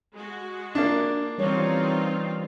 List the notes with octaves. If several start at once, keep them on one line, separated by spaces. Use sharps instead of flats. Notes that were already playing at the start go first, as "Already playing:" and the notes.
G#3 F#4
A#3 D4
E3 G3 C4 D#4 F4 C#5